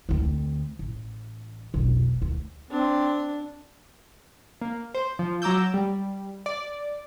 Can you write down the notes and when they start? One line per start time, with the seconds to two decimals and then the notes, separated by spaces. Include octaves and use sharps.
0.09 D2 C4
0.79 A1
1.74 F1 B1
2.22 D2
2.71 C4 D4
4.61 A#3
4.94 C5
5.19 F3
5.42 F#3 A#5 D6 E6 G6
5.74 G3
6.46 D5